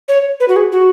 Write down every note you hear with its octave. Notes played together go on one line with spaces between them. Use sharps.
C#5
B4
F#4
G#4
F#4